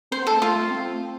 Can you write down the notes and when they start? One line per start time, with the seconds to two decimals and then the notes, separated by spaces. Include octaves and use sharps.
0.12 C4 C5
0.22 B3 A4
0.31 A3
0.41 A3 F4
0.56 A3
0.71 C4